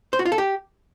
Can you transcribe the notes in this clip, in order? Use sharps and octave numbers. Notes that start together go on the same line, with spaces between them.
C5
F#4
F4
A4
G4